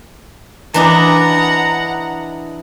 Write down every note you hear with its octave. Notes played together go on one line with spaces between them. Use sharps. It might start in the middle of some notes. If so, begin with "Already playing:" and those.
E3 D4 D#4 F#5 A#5